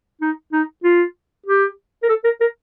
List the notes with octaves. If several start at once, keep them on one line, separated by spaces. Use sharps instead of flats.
D#4
D#4
F4
G4
A#4
A4
A#4
A#4